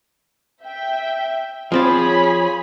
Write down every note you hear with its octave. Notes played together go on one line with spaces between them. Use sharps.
E5 G5
F3 C4 F4 G#4 C#5 B5